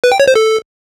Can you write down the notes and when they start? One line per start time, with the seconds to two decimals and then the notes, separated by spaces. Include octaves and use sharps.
0.04 B4
0.12 G5
0.20 C#5
0.28 C5
0.35 A4